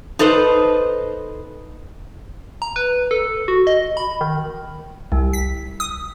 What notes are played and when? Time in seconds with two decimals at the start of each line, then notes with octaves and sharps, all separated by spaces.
0.19 D#4 A4 B4 C5 D#5
2.62 A#5
2.76 B4
3.11 A4
3.48 F#4
3.67 D#5
3.97 B5
4.21 D#3
5.12 C2
5.33 B6
5.80 D#6